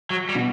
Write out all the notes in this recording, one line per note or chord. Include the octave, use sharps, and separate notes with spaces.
F#3
G3
B2